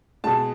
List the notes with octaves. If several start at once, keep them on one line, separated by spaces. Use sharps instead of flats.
B2 G#3 A5